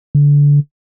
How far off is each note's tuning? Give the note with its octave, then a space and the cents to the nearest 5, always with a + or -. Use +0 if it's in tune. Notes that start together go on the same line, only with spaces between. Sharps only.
D3 -25